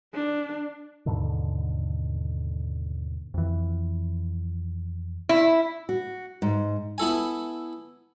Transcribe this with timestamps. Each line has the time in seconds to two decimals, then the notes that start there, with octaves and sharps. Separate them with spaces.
0.14 D4
1.06 D#2 G#2 B2 D3
3.34 F2 E3
5.29 E4
5.89 F#4
6.42 G#2
6.98 B3 E4 A4 G#5